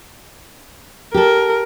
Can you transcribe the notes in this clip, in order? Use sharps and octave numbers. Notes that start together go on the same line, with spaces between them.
G4 A4 A#4